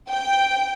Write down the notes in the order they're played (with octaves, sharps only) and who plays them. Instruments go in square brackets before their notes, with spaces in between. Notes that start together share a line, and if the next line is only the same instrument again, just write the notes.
[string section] G5